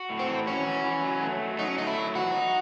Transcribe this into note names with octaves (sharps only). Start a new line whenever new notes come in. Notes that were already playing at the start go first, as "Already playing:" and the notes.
Already playing: F#4
A2
C4
E3
C#4 F#4
E3
E3
F#3
A3
F#3
F#3 D#4
C#4
A3 D#4
E4
F#3
E3 F#4
D#4